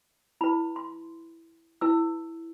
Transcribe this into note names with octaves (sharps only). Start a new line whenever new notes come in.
E4 B4 B5
C6
E4 B4 E6